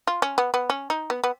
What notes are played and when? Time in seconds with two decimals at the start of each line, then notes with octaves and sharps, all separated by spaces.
0.07 F4
0.22 C#4
0.38 B3
0.54 B3
0.70 C#4
0.90 D#4
1.10 B3
1.24 B3